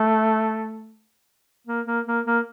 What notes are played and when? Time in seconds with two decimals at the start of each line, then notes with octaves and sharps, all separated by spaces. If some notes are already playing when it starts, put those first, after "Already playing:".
Already playing: A3
1.67 A#3
1.86 A#3
2.06 A#3
2.25 A#3